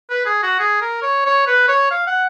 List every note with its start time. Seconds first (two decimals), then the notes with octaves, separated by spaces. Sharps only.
0.10 B4
0.26 G#4
0.43 F#4
0.59 G#4
0.81 A#4
1.02 C#5
1.25 C#5
1.47 B4
1.68 C#5
1.91 F5
2.07 F#5